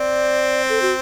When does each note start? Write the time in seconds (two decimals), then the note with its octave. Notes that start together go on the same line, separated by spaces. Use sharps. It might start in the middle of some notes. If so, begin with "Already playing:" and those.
Already playing: C4 D5
0.69 A4
0.82 F#4